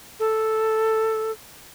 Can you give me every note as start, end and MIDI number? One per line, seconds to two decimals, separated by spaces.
0.20 1.31 69